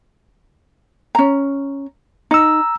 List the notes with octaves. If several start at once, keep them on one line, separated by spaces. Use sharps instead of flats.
C#4 A#5
D#4 A#5 E6